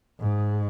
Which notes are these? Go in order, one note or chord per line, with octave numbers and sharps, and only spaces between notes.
G#2